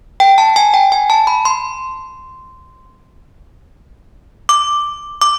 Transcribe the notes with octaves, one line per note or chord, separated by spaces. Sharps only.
G5
A5
G#5
G5
G#5
A5
B5
C6
D6
D6